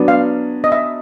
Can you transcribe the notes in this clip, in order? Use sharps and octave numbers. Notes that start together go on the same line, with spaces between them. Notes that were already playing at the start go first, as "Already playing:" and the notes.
Already playing: F#3 B3 D4
F5
D#5
E5